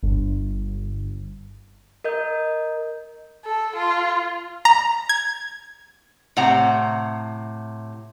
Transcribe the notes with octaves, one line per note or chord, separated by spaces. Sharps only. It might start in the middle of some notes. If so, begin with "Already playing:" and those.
G1
A#4 D#5 G6
A4
F4
A#5
G#6
A2 C3 F#5 A#5